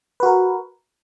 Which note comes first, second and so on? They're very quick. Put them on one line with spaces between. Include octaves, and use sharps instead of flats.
B4 F#4 A#4